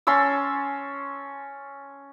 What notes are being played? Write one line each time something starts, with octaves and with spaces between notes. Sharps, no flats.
C#4 A5 C6 E6